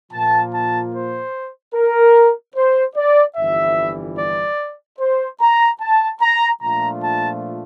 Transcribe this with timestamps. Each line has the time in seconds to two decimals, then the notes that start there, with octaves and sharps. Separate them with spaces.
0.12 A#2 F3 A#3 F4 A5
0.52 A5
0.93 C5
1.75 A#4
2.56 C5
2.96 D5
3.37 G1 F2 E3 G3 E5
4.18 D5
4.99 C5
5.41 A#5
5.81 A5
6.21 A#5
6.61 A#2 F3 A3 D4 F4 A#5
7.03 A5